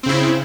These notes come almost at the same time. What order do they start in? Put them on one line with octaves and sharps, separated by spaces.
C4 C#3 E4